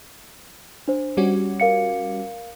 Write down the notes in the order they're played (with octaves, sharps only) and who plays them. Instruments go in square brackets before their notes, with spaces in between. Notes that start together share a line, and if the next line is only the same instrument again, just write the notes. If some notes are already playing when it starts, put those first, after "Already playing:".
[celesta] D4 C5
[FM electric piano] G3 C#4 F#4
[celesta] A#4 F5 C#7